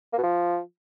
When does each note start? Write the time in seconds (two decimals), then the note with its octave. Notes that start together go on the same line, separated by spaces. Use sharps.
0.13 A#3
0.18 B2
0.23 F3